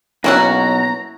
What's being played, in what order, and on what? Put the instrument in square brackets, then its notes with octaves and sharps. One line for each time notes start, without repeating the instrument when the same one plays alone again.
[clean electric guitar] B1 [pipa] A#3 C#4 F#4 [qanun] E4 F#5 A5 [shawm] A#5